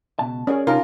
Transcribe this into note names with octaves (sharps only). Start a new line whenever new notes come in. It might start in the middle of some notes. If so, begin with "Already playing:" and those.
C#2 B2 A5
C#4 G#4 A#4 D5
C3 D#4 F4 A#4 A5